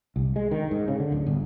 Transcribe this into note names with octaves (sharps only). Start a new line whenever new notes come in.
C2
G#3
D#3
G#2
C#3
D3
D1
G1